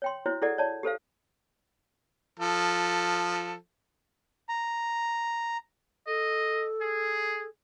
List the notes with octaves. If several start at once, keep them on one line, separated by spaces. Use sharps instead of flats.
C#5 G5 C6
E4 F#4 C5 C#5
E4 G#4 A4 D5 F#5
C#5 D5 A5
G4 A4 C5 F5
F3 A4
A#5
A4 D#5
G#4